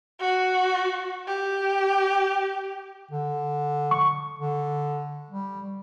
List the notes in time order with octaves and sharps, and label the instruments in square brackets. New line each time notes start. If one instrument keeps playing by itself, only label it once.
[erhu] F#4
G4
[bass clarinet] D3
[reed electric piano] C#6
[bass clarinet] D3
G3